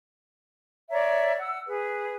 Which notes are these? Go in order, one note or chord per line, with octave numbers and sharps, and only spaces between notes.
C#5 D5 E5 A#5
F#5 E6
G#4 B4